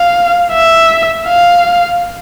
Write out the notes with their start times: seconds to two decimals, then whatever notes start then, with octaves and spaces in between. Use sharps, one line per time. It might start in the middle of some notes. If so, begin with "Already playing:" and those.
Already playing: F5
0.53 E5
1.28 F5